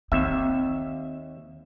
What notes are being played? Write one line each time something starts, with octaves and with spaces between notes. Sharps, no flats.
D#2 C4 E5